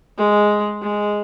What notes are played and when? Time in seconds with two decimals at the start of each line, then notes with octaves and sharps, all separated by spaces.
0.18 G#3
0.82 G#3